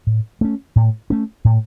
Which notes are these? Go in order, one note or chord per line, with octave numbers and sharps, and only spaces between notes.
A2
A3 C#4
A2
A3 C#4
A2